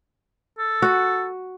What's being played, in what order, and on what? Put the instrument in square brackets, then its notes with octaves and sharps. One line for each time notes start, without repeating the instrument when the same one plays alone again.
[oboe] A4
[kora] F#4 F#5